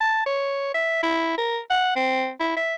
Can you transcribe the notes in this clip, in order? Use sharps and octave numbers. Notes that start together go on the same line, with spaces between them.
A5
C#5
E5
E4
A#4
F#5
C4
E4
E5